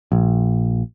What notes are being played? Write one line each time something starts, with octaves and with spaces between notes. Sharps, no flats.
A#1